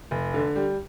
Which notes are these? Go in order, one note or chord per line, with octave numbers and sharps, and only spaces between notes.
F1
D3
G3